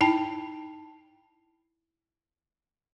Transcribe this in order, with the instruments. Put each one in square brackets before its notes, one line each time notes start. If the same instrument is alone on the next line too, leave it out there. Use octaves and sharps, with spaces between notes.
[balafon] D#4 E4 G5 A5